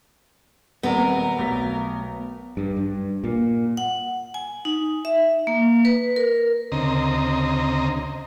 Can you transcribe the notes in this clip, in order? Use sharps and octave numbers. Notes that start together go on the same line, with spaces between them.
D#1 B3 C4 A#4 D5
B1 A3 B6
G2
G2
A#2
F#5
G#5
D#4
E5
A#3
B4
A#4
D2 C#3 C4 D#5 A#5